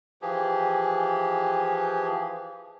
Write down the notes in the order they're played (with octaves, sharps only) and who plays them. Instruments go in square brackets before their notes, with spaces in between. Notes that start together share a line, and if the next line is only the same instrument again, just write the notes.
[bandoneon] E3 F3 G4 G#4